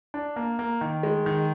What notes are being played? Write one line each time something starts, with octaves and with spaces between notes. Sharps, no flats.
D4
A#3
A#3
D#3
G#3
D#3